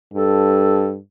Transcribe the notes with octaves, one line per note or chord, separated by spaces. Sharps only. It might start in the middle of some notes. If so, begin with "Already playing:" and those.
G2 A4